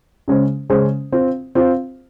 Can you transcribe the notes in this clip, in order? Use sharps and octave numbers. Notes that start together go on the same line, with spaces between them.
C#3 G#3 C#4 G#4 C5
C#3 G#3 C#4 G#4 C5
C4 F4 C5
C4 F4 C5